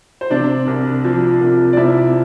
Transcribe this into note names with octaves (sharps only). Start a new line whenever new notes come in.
C5
C3 D4 D5
C2
F3
C2
D5
C3 E4 E5